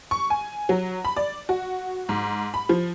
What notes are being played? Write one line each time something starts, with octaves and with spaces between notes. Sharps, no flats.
C#6
G#5
F#3
B5
D5
F#4
G#2
B5
F3